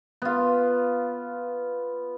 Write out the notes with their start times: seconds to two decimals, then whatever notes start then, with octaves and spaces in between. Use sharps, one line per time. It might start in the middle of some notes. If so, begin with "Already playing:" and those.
0.22 B3 F4